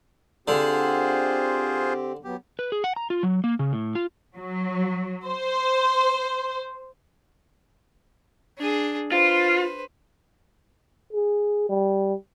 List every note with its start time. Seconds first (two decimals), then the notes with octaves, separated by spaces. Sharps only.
0.48 D3 C4 F4 G4 G#4 C5
2.24 F#3 B3 G4
2.59 B4
2.72 G#4
2.84 F#5
2.96 A#5
3.10 F4
3.23 F#3
3.44 A#3
3.59 C#3
3.73 A2
3.95 F4
4.37 F#3
5.26 C5
8.58 D4 G#4
9.12 F4 B4 C5
11.13 G#4
11.69 G3